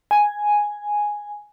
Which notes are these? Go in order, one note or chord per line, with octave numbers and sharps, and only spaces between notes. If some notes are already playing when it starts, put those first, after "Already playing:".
G#5